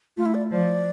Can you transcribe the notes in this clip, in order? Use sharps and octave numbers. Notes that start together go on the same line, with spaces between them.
A3 F4
E4
D5
F3 D5